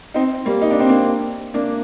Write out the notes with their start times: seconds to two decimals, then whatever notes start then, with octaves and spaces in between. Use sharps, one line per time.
0.14 C4 D#4
0.46 G3 A#3
0.62 D#4
0.71 D4
0.80 C4
0.89 A#3 D4
1.54 A#3 D4